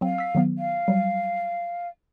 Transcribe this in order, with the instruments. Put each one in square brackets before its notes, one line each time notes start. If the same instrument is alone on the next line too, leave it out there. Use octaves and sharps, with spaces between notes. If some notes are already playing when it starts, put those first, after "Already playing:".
[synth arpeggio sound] F#3 C4 [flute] F5
[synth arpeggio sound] E6 B6
D#3 F#3 B3
[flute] F5
[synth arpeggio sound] F#3 G3